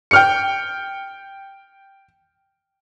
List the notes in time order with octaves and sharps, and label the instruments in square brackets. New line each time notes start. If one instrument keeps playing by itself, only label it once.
[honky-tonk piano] G5 F6 C#7